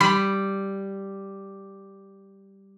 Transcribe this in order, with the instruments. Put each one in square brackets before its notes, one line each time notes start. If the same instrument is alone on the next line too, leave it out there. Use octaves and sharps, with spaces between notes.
[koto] G3 [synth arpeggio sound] B5